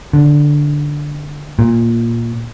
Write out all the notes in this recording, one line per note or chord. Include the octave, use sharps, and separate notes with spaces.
D3
A#2